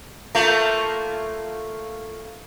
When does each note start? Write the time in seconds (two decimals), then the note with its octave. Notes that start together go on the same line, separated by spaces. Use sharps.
0.35 A3 A#3 F4